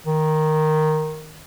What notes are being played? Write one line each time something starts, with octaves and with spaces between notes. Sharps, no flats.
D#3